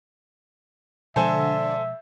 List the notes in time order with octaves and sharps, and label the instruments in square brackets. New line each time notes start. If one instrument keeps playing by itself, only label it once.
[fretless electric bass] B2 F3 G#3 [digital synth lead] D3 [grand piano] A4 C5 G#5 [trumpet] E5